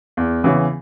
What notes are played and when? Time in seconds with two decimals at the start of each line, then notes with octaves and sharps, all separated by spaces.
0.17 E2
0.44 C#3 E3 B3